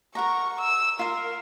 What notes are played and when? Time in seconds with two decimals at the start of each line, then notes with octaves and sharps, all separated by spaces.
0.15 A#4 F#5 A#5 C#6
0.61 E6
0.99 F4 A#4 F5